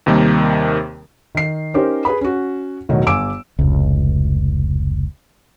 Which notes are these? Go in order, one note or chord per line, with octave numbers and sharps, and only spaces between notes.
D#2 C3 D#3 G3 A#3
D#3 C7
C#4 D#4 G4 A#4 C5
G#4 B4 B5
C#4 F#4
E1 A2 D#3 F#3
G1 G#5 D6 E6 D7
F1 C#2